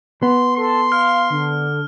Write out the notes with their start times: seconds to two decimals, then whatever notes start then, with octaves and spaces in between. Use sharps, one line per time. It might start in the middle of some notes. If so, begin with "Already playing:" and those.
0.23 B3 C6
0.57 A4 C6
0.92 F5 F6
1.30 D3